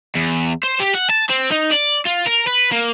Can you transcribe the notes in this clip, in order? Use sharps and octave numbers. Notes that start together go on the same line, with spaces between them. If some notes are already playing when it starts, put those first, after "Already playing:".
E2
C5
G4
F#5
A5
C4
D#4
D5
F4
A#4
B4
A#3